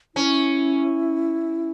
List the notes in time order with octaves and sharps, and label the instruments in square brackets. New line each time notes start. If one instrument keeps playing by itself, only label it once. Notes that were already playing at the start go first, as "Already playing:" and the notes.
[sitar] C#4 [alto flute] E4